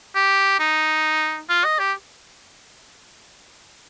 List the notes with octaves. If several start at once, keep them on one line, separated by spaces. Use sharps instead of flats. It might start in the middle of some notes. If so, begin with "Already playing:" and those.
G4
D#4
F4
D#5
G4